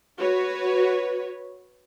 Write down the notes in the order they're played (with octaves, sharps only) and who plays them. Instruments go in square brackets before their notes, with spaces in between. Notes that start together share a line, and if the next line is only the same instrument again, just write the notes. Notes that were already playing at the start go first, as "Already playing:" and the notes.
[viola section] F#4 B4 C#5